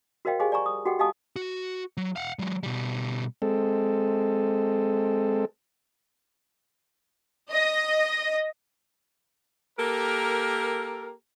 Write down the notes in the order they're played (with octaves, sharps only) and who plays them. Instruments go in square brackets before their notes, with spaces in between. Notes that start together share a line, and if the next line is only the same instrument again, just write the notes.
[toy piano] F#4 A#4 C5 D#5 F5 G5
G4 G#4 C5 D#5 F5 G#5
D5 G#5 A#5 C#6
D#6
F#4 G4 A4 D#5 F#5 G5
G4 D#5 F5 G#5 A5 D#6
[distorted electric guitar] F#4
F#3
F5 F#5
F#3 G#3
B2 G3
[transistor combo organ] G#3 C4 A4
[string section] D#5
[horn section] A#3 G4 A4 A#4